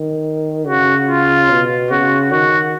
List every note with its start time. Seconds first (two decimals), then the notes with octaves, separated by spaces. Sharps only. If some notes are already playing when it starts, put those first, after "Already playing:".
Already playing: D#3
0.67 C#3 F#4
1.08 F4
1.50 B2
1.90 C#3 F#4
2.31 D#3 F#4